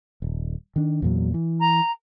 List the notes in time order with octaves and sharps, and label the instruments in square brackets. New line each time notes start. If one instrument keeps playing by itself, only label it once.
[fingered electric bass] D#1
D#3 D4
E2 A#2 F#3
E3
[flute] A#5